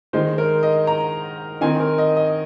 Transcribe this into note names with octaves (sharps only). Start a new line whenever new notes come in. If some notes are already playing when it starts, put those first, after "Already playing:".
D#3 G#3 D#4 C5
A#4
D#5
A#5
D#3 C4 D#4 G#5
A#4
D#5
D#5